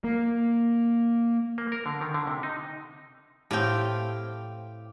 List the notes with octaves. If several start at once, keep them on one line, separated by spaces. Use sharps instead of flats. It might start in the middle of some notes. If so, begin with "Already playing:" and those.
A#3
A#3
A#4
D3
D#3
D3
C3
D#4
A2 C4 G4 F5 G5